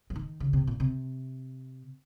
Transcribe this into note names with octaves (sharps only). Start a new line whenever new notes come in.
F3
D#3
C#3
C3
A#2
C3